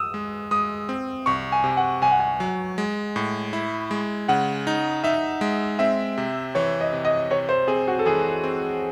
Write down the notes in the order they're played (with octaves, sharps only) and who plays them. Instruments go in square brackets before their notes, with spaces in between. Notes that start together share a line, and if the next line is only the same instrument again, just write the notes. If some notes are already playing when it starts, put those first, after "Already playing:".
Already playing: [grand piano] D#6 E6
[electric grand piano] G#3
[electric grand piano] G#3 [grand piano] D#6
[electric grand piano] C4
[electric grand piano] C2 [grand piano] C#6
[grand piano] G#5
[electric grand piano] C3
[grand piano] F#5
[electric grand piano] C2 [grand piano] G#5
[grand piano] F#5
G#5
[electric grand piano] F#3
G#3
A2
E4
G#3
[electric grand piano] C#3 [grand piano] F#5
[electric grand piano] D#4
[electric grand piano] D#4 [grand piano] E5
[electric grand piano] G#3
[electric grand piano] C4 [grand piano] E5
[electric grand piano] C3
[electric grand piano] E3 [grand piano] C#5
[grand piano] D#5
[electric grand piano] C3
[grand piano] D#5
[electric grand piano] C3 [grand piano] C#5
[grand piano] C5
[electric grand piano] C4 [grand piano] G#4
[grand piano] F#4
A4
[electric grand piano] E3 [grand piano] G#4
[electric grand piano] C4